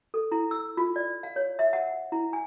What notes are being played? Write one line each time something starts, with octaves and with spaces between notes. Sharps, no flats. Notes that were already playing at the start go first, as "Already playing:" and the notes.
A4
E4
E6
F4
D5
F5
C#5
E5
F#5
E4
G#5